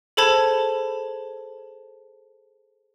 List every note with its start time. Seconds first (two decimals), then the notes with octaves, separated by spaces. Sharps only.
0.17 G#4 A4 C5 A5 B5 G#6